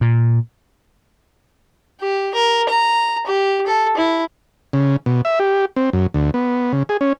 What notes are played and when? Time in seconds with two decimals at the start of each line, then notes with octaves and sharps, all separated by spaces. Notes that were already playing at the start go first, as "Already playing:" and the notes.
0.01 A#2
2.00 G4
2.34 A#4
2.68 A#5
3.26 G4
3.66 A4
3.97 E4
4.73 C#3
5.06 B2
5.25 E5
5.40 G4
5.76 C4
5.93 F#2
6.14 D2
6.34 B3
6.72 C#3
6.89 G#4
7.01 C#4